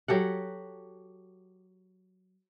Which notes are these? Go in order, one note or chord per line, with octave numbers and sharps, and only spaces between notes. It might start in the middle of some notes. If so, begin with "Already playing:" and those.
F#3 G4 A4 F#5